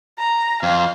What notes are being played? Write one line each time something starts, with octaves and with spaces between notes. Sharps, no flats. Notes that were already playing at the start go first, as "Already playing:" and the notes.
A#5
F2 F5